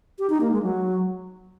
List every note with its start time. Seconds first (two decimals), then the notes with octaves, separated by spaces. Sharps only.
0.19 G4
0.30 D#4
0.41 A#3
0.52 G#3
0.62 F#3